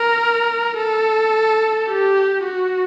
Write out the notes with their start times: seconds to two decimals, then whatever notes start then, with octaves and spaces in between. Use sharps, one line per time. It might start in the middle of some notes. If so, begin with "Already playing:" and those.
Already playing: A#4
0.78 A4
1.89 G4
2.44 F#4